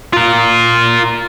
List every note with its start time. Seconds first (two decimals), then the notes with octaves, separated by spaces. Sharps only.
0.13 F4 A#4